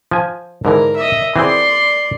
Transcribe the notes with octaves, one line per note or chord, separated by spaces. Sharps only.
F3 G#5
G#2 D3 E3 A#4
D#5 E5
E3 C4 G#4 D5 C6